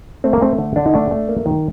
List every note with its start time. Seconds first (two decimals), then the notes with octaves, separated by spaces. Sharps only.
0.24 A3 C4
0.33 A#3
0.41 A3 C4
0.58 D3
0.76 D3 D4
0.86 D#4
0.94 A3 D4
1.11 A3
1.29 A#3
1.46 D#3